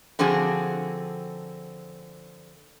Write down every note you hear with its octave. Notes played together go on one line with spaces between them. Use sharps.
D3 F3 C4 F#4 G#4